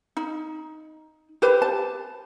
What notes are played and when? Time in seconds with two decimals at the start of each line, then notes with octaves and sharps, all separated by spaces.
0.17 D#4
1.42 G4 B4 C5
1.62 A5